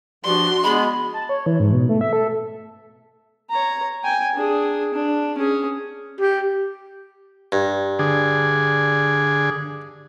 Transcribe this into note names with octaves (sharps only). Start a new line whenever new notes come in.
G2 F3 D4 F#4 C6
G#3 B3 B5
A5
C#5
E3
G#2
B2
A3
E5
A4
C#5 A#5
G5 G#5
D4 G#4
D4
C#4 G#4
G4
G2
D3 G#4